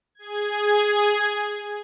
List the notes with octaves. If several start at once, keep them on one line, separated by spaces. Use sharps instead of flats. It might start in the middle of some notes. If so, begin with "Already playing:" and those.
G#4 G#6